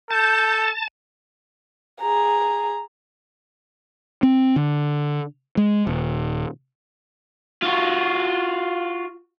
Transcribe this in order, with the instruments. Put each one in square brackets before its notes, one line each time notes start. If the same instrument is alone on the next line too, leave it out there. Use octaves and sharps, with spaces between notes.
[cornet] A4 [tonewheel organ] A5 [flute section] G6
[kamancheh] G#4 A#5
[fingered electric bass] C4
D3
G#3
D#1
[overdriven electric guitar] F4 F#4